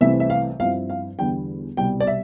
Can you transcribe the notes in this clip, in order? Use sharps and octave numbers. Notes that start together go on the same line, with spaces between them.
C2 C3 E3 A3 C4 E5
E5
F5
G2 F3 C4 E4 F5
F5
E2 D3 G3 B3 D4 G5
C2 B2 G3 G5
D5
E5